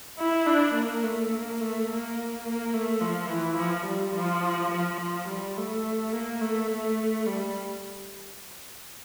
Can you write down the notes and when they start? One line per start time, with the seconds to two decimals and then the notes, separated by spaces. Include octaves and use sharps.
0.19 E4
0.46 D4
0.74 A#3
1.03 A3
1.32 A#3
1.61 A3
1.88 A#3
2.44 A#3
2.74 A3
3.01 F3
3.30 E3
3.58 F3
3.86 G3
4.15 F3
4.72 F3
5.01 F3
5.28 G3
5.57 A3
6.13 A#3
6.41 A3
6.71 A3
7.26 G3